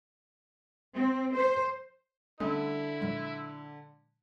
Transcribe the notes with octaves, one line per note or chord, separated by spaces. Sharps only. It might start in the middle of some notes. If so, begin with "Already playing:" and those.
C4
C5
D3 G3 A3 C#4 E4
A#2 F#3 G#3